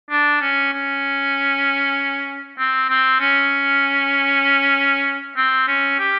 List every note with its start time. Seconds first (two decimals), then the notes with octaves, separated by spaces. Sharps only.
0.10 D4
0.41 C#4
0.73 C#4
2.59 C4
2.89 C4
3.20 C#4
5.37 C4
5.68 C#4
5.99 G4